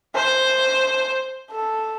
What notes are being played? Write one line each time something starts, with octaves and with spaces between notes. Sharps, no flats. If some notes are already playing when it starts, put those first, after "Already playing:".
C5
A4